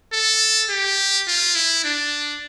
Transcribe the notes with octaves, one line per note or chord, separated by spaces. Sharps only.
A4
G4
F4
E4
D4